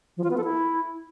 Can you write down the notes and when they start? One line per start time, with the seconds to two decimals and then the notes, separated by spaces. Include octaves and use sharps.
0.17 F3
0.24 F4
0.31 B3
0.37 A4
0.44 E4